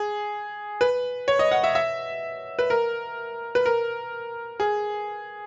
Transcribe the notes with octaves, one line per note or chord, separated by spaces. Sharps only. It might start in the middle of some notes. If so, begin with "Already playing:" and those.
Already playing: G#4
B4
C#5
D#5
F#5
E5
E5
B4
A#4
B4
A#4
G#4